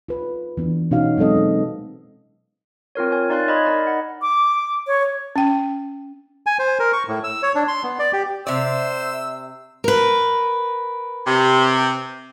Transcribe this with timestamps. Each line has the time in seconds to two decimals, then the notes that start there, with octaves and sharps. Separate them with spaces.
0.09 F4 B4
0.57 E3 B3 D4
0.91 B2 C#4 D#4 F#4 F5
1.17 F#3 G#3 C4 A4 D#5
1.34 B3 D#4
2.95 C4 F4 A#4 C#5
3.12 A#4 C#5 G#5
3.30 D#4 D5 F5 C6 F#6 A6
3.47 C#5 D#5 B5 G#6
3.65 D#4 A#4 D5 D#5 B5
3.87 F#5
4.22 D6
4.87 C#5
5.36 C#4 G5
6.46 G#5
6.59 C5
6.79 A#4
6.93 C#6
7.08 A2
7.24 E6
7.43 C#5
7.55 D4
7.68 C6
7.84 B3
7.99 D5
8.13 G4
8.47 C3 C5 D5 E5 E6
9.84 A#4 B4
11.27 C3